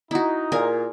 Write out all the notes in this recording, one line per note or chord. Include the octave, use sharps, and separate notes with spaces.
D#4 E4 F#4
A#2 G#4 A#4 G#5